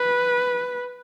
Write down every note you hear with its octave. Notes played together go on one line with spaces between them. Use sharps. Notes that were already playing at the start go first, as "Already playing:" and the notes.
Already playing: B4